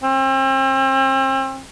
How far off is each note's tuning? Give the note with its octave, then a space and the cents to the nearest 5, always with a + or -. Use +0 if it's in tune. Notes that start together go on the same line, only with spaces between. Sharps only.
C4 +40